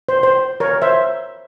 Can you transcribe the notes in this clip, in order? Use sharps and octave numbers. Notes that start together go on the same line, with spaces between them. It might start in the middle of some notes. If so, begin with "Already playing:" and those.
C5
C5
A#4 C#5
C5 E5